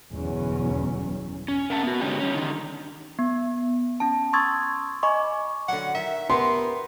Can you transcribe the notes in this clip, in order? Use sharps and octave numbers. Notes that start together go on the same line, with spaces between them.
G1 E2 B2 F#3 C#4
C#4
A#4 E5 F#5 A5
B3 F#4
G2 D3 G#3 C#4 D#4 G4
G3 C#4
D3 D#3
B3
C#4 A5
C6 C#6 D#6 E6 G#6 A6
D#5 G#5 B5 C#6 D6
D3 F#3 F#5
D#3 E5
B3 G4 A#4 E5 C6